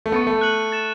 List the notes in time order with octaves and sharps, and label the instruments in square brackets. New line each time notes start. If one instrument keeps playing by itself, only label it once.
[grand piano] A3
[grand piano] B3 [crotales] C#6 A6 C#7
[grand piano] A3
[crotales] F#6 C#7 F#7
A6 E7